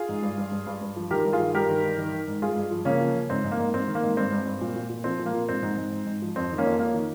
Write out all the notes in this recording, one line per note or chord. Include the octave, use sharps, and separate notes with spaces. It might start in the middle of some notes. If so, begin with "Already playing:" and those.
Already playing: F4 G#4
G#2
G2
G2
G2
G2
G2
F3
D#3 G4 A#4
G2
F4 G#4
D#3
G2 G4 A#4
D#3
G2
D#3
D#3
G#2
G2 F4 G#4
G2
F3
C#3 A#3 C#4
F3
C#3
G#2 C4
G#2
A#3
G#2
G#2 C4
D#3
A#3
G#2
G2 C4
G2
G2
A#2
A#2
A#2
F3 C4
A#2
A#3
A#2
G#2 C4
G#2
G#2
G#2
G#2
F3
F2 C4
D#3
A#3 C#4
F2
F2 A#3
D#3